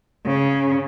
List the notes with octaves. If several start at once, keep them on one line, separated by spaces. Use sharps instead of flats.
C#3